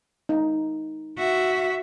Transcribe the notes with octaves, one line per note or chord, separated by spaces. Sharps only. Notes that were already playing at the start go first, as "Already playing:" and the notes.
D#4
F#4 E5